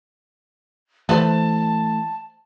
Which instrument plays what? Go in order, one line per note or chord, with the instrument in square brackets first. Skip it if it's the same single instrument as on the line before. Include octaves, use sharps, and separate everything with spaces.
[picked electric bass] E3 A3 [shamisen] B4 C5 [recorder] A5